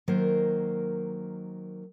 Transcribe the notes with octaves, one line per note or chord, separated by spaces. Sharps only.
D#3 F#3 A#3 A#4 C5